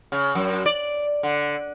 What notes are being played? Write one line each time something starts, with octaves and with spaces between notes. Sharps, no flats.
C#3
F#2
D5
D3